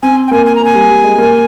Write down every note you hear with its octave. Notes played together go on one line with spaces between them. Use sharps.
C4 G#5
G5
A#3 G#5
G#5
A#5
A#3 G#5
G3
G3
G#3
A#3